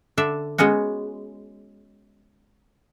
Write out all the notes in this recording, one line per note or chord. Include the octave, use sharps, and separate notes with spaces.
D3 D4 E5
G#3 B3 C#4 F#4